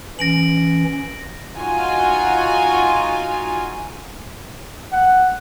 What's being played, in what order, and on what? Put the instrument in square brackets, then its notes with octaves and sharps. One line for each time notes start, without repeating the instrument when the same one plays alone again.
[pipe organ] E3 C#4 [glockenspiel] A#6 D7 F#7
[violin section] D#4 F4 F#4 G#5
[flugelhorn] F#5